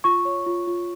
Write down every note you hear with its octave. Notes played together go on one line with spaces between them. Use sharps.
F4 C#6
C#5
F4
F4